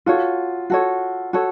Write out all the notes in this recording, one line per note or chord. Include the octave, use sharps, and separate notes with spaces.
F4 F#4 A4 C#5
F#4 A4 C#5
F#4 A4 C#5